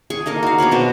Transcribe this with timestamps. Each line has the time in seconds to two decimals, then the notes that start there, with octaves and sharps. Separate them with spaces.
0.10 G#4 C#6
0.26 A#3 D#4 A#4 D#5
0.43 F#4 F5
0.58 B3 D4 B4 C#5
0.71 B2 C4